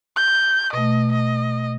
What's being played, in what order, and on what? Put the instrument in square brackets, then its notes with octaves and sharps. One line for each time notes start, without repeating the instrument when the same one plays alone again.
[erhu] G6
[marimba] B2 A3 [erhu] D#5
[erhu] D#5